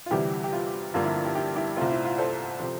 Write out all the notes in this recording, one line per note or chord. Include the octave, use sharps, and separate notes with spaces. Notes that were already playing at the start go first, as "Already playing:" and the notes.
F4
D2 C3 E3 G3 E4 G4
G4
F4
G2 D3 F3 A#3 F4
E4
F4
E4 G4
E4 G4
E4 G4
C2 A#2 A3 C4 F4
E4
F4
A4 C5
C3 F3